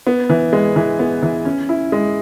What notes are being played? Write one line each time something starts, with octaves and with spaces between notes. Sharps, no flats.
B3
E3
G#3
E3
B3
E3
C#4
E4
G#3